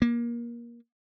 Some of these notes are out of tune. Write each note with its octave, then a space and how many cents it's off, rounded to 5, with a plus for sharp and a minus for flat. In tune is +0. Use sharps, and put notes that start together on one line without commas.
A#3 +25